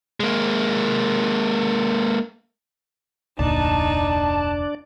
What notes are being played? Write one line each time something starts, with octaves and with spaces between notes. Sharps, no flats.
G#3 A#3
F1 D2 A#2 D4 D#4 D5 A5